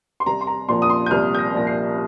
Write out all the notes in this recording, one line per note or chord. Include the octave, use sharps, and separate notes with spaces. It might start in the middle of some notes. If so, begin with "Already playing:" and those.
C6
C2 A#5
C6
A#5
A#2 F3 C6
D#6
C6
G6
C2 F6
G6
A#6
A#2 F3 A#6
C7